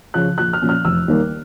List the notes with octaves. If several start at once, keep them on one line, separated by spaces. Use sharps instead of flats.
C#3 F3 F#6
A#1 F#6
F6
A#2 F3 A#3 C#4
F6
F1 E6
D#2 D#3 G3 A#3